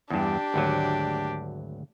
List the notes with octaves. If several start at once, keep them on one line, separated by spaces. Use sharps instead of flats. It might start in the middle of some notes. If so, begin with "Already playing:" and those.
E2 G2 D4 G4
G#1 D2 F#3